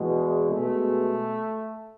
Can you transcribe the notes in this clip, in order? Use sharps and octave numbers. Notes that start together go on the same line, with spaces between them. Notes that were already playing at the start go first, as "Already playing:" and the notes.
Already playing: E2 B2 G#3
B2 G#3 A3